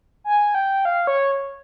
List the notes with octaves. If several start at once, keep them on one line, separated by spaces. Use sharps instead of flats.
G#5
G5
F5
C#5